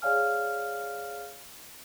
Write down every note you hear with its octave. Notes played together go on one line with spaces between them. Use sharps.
G#4 C#5 D5 F5 G#5 F6